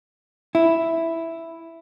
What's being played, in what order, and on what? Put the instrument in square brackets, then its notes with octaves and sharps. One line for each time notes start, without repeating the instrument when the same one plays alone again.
[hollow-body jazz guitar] E4